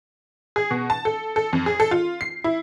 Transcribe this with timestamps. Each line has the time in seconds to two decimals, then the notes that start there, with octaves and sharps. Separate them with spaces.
0.56 G#4
0.71 B2
0.90 A5
1.05 A4
1.36 A4
1.53 F2
1.66 G#4
1.80 A4
1.91 F4
2.21 C7
2.44 E4